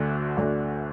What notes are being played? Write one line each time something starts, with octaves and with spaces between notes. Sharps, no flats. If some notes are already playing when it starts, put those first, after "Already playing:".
Already playing: D2 D3 A3 D4 F#4
D2 D3 A3 D4 F#4